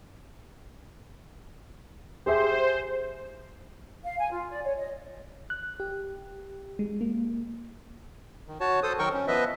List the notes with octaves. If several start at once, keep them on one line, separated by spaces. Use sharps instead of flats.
G4 G#4 C5 E5
F5
G#5
F4
D5
C#5
D#5
F#6
G4
G#3
A#3
D#3
F#4 C#5 A5
A4 C5 D#6
D#3 F#3 A#4 G5 C#6
C#4
F3 B3 B4 D#5 E5